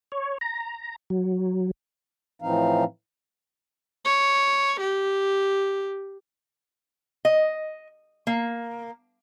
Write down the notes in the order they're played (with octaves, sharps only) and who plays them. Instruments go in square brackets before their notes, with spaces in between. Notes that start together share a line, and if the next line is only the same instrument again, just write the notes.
[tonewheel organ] C#5
A#5
F#3
[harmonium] A2 E3 F3 C4 D#4 F5
[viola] C#5
G4
[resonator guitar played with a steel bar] D#5
A#3